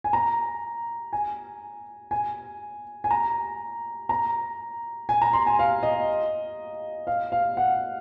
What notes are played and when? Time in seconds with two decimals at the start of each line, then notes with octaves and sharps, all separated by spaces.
0.04 G#5
0.13 A#5
1.13 G#5
2.11 G#5
3.04 G#5
3.11 A#5
4.09 A#5
5.09 G#5
5.22 A#5
5.33 C6
5.47 G#5
5.59 F5
5.83 D#5
7.07 F5
7.32 F5
7.57 F#5